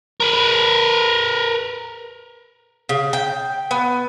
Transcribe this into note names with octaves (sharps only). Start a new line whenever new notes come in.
A#4 B4
C#3
G5
B3